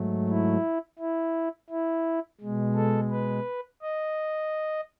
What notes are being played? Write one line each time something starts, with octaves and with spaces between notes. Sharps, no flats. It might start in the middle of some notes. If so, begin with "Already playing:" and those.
Already playing: G#2 F#3 A3
E4
E4
E4
B2 G#3
A4
B4
D#5